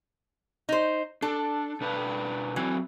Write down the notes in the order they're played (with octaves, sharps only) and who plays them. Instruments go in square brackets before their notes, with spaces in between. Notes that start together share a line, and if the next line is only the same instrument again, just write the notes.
[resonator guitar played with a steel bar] D#4 C5
[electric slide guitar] D4 [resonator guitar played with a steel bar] A4
[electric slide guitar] B2 D4 B4
[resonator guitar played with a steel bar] E3 [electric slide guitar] F#3 C4